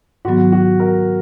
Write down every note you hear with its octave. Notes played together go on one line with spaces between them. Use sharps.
G#2 D#3 F#3 B3 F#4
F#4
A#4